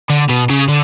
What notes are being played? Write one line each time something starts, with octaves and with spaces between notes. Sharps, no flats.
D3
B2
C#3
D3